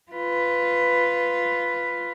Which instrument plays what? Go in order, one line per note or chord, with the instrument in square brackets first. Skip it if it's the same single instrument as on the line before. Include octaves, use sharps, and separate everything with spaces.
[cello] F4 B4